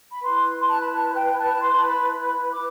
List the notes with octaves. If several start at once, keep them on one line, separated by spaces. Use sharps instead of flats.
B5
E4 B4 C6
A5
B5
A5
G5
A5
C6
A5
B5
B5
D6